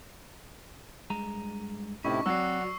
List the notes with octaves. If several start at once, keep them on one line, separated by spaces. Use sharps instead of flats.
G2 G#3 A#5
A2 C3 C#4 D#4 E4 A5 C#6
F#3 C4 F#4 D5 E6 C7